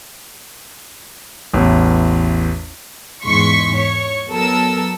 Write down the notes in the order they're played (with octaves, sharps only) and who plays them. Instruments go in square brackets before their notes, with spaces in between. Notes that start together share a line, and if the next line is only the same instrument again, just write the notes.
[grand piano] A1 E2
[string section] E2 G#2 G#3 C6 C#6 B6
C#5 C#6
F#3 B3 A4 A#4 E6